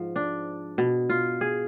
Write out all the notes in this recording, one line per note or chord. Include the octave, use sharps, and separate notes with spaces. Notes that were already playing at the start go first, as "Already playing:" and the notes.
Already playing: G#2 F3
D4
B2
F4
G#4